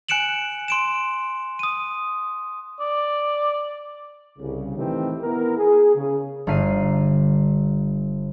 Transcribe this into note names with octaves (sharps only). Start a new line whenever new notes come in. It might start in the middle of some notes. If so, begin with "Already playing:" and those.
G#5 F#6 C#7 D7 E7 F#7
C6 D7 E7
D#6 D#7
D5
C2 C#3
A2 D#3 E3 A3 C4 G4
B3 E4 A#4
G#4
C#3
G1 D3 F5 C7 D#7